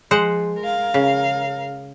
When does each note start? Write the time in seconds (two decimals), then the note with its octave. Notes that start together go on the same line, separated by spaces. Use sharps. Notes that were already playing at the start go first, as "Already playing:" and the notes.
0.11 F3 G#3 C5 F#5
0.61 A#4 F5
0.94 C#3